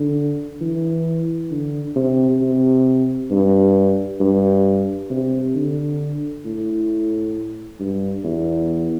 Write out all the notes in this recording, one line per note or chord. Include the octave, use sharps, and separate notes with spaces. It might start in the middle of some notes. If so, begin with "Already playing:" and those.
Already playing: D3
E3
D3
C3
C3
G2
G2
C3
D3
A2
G2
E2